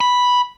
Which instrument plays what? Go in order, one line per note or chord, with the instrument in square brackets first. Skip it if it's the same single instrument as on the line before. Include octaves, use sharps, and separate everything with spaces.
[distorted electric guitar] B5